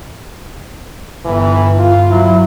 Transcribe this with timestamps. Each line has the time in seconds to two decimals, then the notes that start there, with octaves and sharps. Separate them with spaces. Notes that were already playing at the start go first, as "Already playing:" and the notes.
1.25 G1 E3
1.79 F4
2.10 F#3 E4